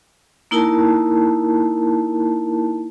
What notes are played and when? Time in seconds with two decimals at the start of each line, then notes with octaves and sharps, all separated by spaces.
0.51 A#3 D#4 E4 A#4 A5